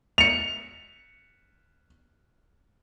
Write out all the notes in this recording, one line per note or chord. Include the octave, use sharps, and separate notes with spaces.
C#7 F7